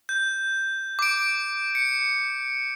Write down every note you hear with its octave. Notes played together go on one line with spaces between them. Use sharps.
G6
D6 D7
C#7